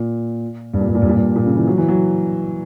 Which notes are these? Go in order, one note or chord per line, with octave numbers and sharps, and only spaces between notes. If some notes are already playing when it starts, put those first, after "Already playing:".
Already playing: A#2
G2
A#2
G2
A#2
G2
A#2
G2
A#2
C#3
E3
F#3
E3
F#3